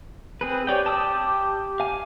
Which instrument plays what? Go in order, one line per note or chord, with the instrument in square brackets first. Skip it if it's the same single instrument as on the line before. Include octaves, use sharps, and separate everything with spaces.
[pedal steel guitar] C4 G#4 B4
[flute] G4 [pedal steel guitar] C#5 D5 G5
[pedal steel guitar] A5 D#6 E6
F5 G#5